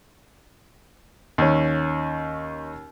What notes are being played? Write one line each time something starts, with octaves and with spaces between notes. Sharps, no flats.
D#2 C#4